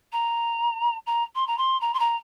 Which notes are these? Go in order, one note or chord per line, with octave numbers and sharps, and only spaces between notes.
A#5
A#5
C6
A#5
C6
A#5
C6
A#5